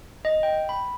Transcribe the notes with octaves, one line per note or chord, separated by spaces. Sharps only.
D#5
G5
B5